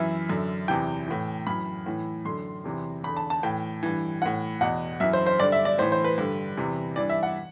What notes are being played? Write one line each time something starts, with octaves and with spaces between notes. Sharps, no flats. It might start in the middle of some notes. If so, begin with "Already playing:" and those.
Already playing: F#2 E3 E5
F#2 D3
E2 C3 E3 G5
A2 E3
F#2 E3 B5
A2 E3
F#2 D3 C6
E2 C3 E3
E2 D3 B5
A5
A5
A2 E3 G5
G2 E3
A2 E3 F#5
E2 B2 F#5
F#2 E3 E5
C5
C5
G2 D3 D5
E5
D5
A2 E3 C5
C5
B4
G2 D3
E2 C3 E3
G2 E3 D5
E5
F#5